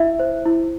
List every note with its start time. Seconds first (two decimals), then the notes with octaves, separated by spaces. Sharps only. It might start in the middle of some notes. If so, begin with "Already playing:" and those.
Already playing: E4 E5
0.19 C5
0.46 E4